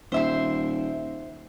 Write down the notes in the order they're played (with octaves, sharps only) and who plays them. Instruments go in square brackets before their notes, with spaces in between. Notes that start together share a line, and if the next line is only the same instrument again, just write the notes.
[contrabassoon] D#1 [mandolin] C5 E5 C6